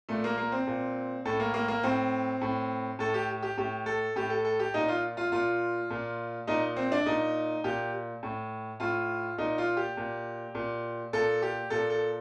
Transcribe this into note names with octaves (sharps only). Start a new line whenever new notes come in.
A#2 A3
A#3
A#3
C4
A#2
A2 A4
A#3
A#3
A#3
A2 C4
A2
A2 A4
G4
G4
A2 G4
A4
A2 G4
A4
A4
G4
A#2 D#4
F4
F4
A#2 F4
A#2
A#2 D#4
C4
D4
A#2 D#4
A#2 G4
A2
A2 F4
A#2 D#4
F4
G4
A#2
A#2
A#2 A4
G4
A#2 A4
A4